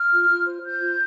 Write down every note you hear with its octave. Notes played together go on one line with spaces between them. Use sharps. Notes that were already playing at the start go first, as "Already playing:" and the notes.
Already playing: F6
F4
F4
C5
C5 G6
F4